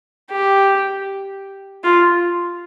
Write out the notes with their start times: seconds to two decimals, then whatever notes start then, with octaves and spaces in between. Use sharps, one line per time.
0.31 G4
1.84 F4